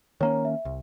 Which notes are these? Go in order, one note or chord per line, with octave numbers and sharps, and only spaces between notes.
D#3 A#3 C#4 C#5 A#5
E5
C2